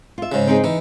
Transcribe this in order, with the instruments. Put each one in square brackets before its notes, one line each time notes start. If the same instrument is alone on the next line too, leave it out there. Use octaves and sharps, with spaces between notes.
[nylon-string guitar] F4 E5
[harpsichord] G#2 C#3
[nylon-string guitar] C4 D#4 G#4
[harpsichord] E3 [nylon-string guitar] D#4